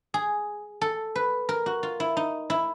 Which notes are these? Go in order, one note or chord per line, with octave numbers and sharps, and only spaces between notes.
G#4
A4
B4
A#4
F#4
F4
E4
D#4
E4